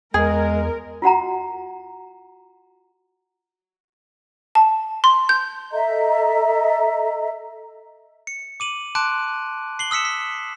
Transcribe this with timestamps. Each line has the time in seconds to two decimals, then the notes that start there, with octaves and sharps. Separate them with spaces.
0.14 E2 G#3 G#4 A#4
1.02 F4 F#4 F#5 A#5
4.55 A5
5.04 C6
5.29 G6
5.72 A4 D#5 E5 A#5
8.27 C#7
8.60 D6 D#7 F#7
8.95 A5 C6 D6 F#6 D7
9.79 C7 F#7 G7
9.91 D#6 E6 B6 C#7 E7
10.05 B6